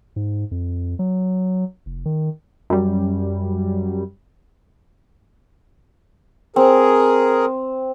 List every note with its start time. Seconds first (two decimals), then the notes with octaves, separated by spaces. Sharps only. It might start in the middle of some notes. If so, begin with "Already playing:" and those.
0.16 G#2
0.51 F2
0.99 F#3
1.86 F1
2.05 D#3
2.70 F#2 G3
6.56 C4 G#4 A#4